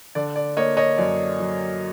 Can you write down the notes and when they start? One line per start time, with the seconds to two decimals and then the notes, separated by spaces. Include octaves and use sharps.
0.15 D3 D5
0.36 D5
0.57 A#3 C#5 D#5
0.77 C#5 D#5
0.97 F#2 D5
1.39 F#3